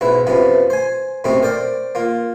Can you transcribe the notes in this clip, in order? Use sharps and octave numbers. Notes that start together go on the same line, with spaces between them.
B1 G#2 E4 B4
F#2 C3 F3 B3
C5 G#5
F#2 A2 C3 A3 C4 D#4
A#4 C5 D5 G5
A#3 F4